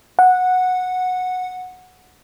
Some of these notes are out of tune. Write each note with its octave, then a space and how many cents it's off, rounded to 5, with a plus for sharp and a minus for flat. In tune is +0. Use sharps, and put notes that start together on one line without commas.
F#5 -10